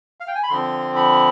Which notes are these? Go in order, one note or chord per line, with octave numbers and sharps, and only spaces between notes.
F5
G5
G#5
B5
D3 F3 C4 C6
B5